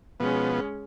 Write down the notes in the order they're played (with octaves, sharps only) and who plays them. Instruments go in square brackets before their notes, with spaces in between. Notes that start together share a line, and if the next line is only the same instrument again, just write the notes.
[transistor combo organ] B2 F3 B3 [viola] G#3 C#4